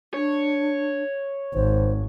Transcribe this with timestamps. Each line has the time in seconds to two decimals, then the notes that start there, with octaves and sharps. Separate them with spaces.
0.14 D4 C#5
1.54 G#1 C5